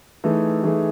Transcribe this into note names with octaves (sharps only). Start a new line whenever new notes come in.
E3 A3 D#4 G#4
E3 A3 D#4 G#4